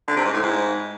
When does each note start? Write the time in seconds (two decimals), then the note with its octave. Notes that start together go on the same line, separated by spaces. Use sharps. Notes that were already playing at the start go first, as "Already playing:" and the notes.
0.08 D3
0.17 C3
0.25 G#2
0.34 A2
0.42 G#2